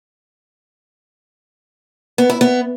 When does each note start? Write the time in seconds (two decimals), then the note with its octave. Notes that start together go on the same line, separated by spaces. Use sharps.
2.18 B3
2.30 E4
2.41 B3